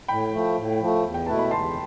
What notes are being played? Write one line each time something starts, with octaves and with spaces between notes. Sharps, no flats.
A2 G5 B5
F3 A3
A2
F3 A3
E2
G5
B2 A3 E4 B4 A5
B5
E2 A5 C6